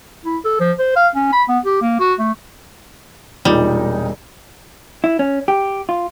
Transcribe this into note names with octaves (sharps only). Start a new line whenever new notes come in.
E4
A4
F3
C5
F5
C#4
B5
B3
G4
A#3
F#4
A3
E1 A#2 G3 D#4
E4
C#4
G4
F4